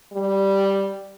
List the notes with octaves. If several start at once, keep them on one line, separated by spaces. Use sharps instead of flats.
G3